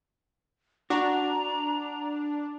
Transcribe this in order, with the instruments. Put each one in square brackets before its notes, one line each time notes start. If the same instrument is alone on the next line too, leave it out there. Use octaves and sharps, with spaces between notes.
[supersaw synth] D4 [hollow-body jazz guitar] F#4 [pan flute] A#5